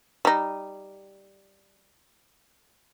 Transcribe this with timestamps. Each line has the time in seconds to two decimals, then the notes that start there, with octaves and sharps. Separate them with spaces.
0.25 G3 D#4